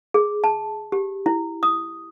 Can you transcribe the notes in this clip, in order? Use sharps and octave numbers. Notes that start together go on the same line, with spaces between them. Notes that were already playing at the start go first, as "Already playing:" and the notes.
G#4
A5
G4
E4
D#6